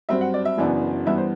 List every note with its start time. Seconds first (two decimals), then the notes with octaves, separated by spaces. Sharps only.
0.09 G2 F#3 C4 E5
0.21 F#5
0.34 D5
0.45 E5
0.58 F#1 F#2 E3 B3 D4
1.06 G2 E3 B3 E5
1.18 C5